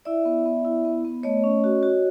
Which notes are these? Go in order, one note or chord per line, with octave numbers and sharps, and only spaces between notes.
E4 D5 E5
B3
B3
E4
B3
B3
A3 C#5 D#5
C#4
F#4
F#4